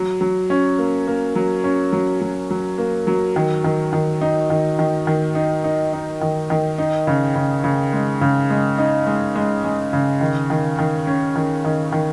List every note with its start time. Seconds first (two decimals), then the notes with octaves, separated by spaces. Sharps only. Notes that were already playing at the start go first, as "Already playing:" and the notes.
Already playing: F#3
0.21 F#3
0.50 C#4
0.78 A#3
1.07 A#3
1.35 F#3
1.64 C#4
1.92 F#3
2.21 F#3
2.51 F#3
2.78 A#3
3.07 F#3
3.36 D#3
3.64 D#3
3.93 D#3
4.21 D#4
4.50 D#3
4.79 D#3
5.07 D#3
5.35 D#4
5.64 D#4
5.93 D#4
6.21 D#3
6.50 D#3
6.78 D#4
7.07 C#3
7.35 C#3
7.64 C#3
7.93 G#3
8.21 C#3
8.50 G#3
8.78 D#4
9.07 G#3
9.36 G#3
9.64 G#3
9.93 C#3
10.21 D#3
10.50 D#3
10.79 D#3
11.07 C#4
11.35 D#3
11.64 D#3
11.92 D#3